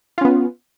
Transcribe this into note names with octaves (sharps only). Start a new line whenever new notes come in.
B3 C#4 F4